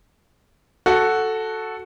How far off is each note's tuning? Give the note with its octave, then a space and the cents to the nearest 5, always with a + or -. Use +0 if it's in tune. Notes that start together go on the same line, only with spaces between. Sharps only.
F#4 +0 A4 +0